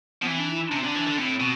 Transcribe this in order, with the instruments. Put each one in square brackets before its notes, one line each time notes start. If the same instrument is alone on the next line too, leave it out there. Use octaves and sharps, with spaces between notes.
[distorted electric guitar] F3 [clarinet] B3
[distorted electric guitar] E3 [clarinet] C4
[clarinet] D4
E4
E4
D4
[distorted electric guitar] C3
[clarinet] C4
[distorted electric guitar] D3 [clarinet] D4
[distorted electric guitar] E3
D3
[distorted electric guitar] A2 [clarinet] C4
[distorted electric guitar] B2